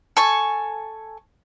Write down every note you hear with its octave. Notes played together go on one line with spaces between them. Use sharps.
A4 G#5 C#6